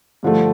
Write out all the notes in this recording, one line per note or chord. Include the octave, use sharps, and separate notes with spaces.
G2 D3 F3 A3